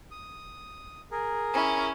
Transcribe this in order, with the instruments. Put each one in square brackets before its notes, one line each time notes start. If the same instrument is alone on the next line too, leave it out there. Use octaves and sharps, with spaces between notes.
[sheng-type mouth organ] D#6
G#4 A#4
[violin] C#4 E4